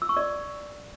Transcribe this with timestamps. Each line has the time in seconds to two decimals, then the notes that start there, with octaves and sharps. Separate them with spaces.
0.02 E6
0.09 C#6
0.17 D5